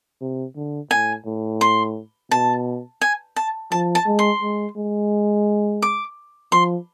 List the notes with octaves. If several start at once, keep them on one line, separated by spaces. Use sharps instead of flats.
C3
D3
A2 G#5
A2
C6
B2 A5
G#5
A5
F3 A5
A5
G#3
C6
G#3
G#3
D6
F3 C6